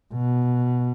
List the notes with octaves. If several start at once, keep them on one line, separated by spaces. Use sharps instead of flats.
B2